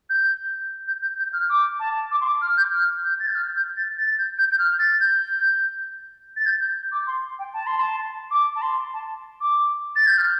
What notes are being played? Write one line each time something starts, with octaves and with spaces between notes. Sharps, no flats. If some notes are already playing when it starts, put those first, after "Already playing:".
G6
G6
G6
G6
F6
D6
A5
D6
C6
D6
F6
G6
F6
G6
A6
G6
F6
G6
A6
A6
G6
G6
G6
F6
A6
G6
A6
G6
G6
D6
C6
G5
A5
C6
A5
D6
A5
C6
A5
D6
A6
G6
F6